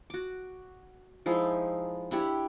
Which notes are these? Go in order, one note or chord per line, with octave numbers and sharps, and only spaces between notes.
F#4 D6
F3 G#3 D#4 E4
D4 E4 G4 C#5